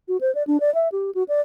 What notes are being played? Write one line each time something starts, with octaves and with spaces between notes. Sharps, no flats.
F#4
C5
D5
D4
D5
E5
G4
F#4
D5